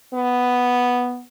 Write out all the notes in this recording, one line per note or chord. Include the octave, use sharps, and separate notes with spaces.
B3